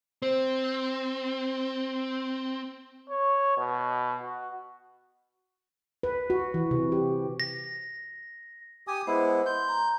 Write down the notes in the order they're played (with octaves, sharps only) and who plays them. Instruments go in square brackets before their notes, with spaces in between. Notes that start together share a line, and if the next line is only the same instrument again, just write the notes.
[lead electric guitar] C4 [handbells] C5
[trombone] C#5
B2
F#4
[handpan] B4
F#4
E3
C3
G4
[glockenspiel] A#6
[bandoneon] G4 G#5 D#6
[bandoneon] G#3 B3 E4 [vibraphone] C5
[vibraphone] C6 [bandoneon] G6
[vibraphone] A#5